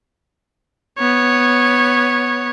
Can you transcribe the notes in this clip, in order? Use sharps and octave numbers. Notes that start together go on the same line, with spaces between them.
B3 C#5